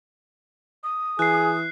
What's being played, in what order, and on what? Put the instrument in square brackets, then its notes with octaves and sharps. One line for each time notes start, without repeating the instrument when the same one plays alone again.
[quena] D#6
[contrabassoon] E3 [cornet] G#4 [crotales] F#6 C7